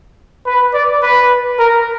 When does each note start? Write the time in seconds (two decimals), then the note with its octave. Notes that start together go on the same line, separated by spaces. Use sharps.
0.46 B4
0.74 D5
1.03 B4
1.59 A#4